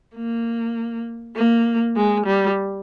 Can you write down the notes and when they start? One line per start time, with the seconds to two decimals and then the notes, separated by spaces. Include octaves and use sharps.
0.15 A#3
1.36 A#3
1.96 G#3
2.26 G3